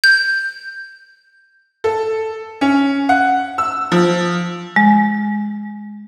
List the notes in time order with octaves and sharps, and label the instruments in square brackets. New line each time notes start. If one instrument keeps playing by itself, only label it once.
[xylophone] G6
[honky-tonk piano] A4
C#4
F#5
E6
F3
[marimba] G#3